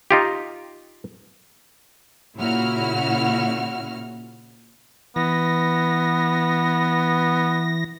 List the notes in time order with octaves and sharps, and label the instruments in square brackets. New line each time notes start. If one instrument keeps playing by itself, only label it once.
[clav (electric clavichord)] D#4 F4 G4
[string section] A#2 C#3 E4 F#4 F6
[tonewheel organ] E3 A#6 [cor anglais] B3